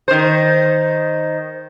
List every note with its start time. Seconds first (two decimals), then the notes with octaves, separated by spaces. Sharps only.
0.08 D#3 C5